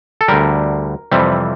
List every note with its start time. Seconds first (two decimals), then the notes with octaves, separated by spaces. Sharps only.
0.21 A4
0.28 D2 D3 G3 A#4
1.12 F2 C3 E3 G3